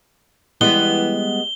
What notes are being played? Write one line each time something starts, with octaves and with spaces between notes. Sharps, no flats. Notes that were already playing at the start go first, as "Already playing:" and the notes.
E3 G3 G#3 B3 G7